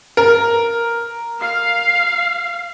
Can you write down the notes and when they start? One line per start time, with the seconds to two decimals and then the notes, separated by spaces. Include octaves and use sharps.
0.17 A#4
1.40 F5